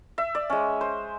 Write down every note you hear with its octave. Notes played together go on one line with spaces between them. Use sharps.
E5
D5
G#3 C#4
C5